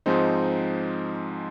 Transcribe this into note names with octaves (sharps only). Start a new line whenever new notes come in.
G#2 F3 G#3 C4 D#4